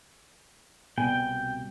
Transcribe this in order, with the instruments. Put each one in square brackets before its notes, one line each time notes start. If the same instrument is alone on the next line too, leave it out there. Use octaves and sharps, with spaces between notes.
[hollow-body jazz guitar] C2 B2 G#5 [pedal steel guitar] G5